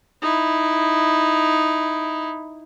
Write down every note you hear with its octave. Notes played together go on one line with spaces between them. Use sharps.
D#4 E4